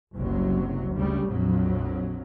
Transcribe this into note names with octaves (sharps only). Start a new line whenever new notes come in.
F#1 C2 F#3
D2 C#3 G3
A#1 F2 F#3